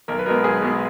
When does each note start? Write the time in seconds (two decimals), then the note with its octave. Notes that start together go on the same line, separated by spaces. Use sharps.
0.08 B1 A#4
0.19 B4
0.26 B2 G#3 B3 A#4
0.44 B1 G#4
0.62 B2 G#3 B3